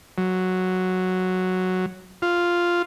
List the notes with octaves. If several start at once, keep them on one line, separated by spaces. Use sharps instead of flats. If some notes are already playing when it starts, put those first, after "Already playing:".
F#3
F4